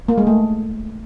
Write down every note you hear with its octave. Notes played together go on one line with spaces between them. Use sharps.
A#3
G#3
A3